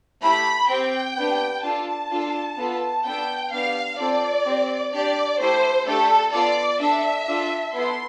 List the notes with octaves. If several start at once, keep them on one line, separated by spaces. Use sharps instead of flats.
A3 E4 G4 B5
C4 G4 G5
B3 D4 G4
D4 F4 A4 A5
D4 F4 A4
B3 F4 A4
B3 D4 A4 G5
B3 D4 G4 F5
C4 F4 A4 D5
C4 G4
D4 G4 D5
A3 E4 G4 C5
A3 D4 G4 A4
B3 F4 A4 D5
D4 A4 E5
D4 F4 A4
B3 E4 A4 C6